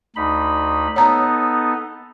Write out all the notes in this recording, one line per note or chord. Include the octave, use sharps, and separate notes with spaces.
D2 D#4 B5
B3 D#4 A4 C#5 A#5